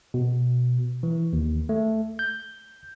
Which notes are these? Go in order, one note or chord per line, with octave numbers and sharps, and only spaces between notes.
B2
E3
D#2
A3
G6